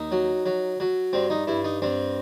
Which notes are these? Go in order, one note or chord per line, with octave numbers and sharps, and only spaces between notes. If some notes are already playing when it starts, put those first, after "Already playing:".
Already playing: D#2 D#4
F#3
F#3
F#3
G2 C4
D#4
G2 E4
D#4
G2 C4